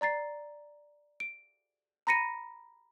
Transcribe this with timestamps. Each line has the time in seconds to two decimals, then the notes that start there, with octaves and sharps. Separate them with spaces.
0.01 D5 A#5 A6 C7
1.20 D7
2.07 A#5 B5 A#6 C#7 D#7